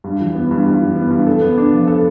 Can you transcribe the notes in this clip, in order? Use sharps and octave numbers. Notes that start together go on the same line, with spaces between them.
G2
E3
B3
G2
G2
E3
B3
G2
A4
B3
D4
F3
A4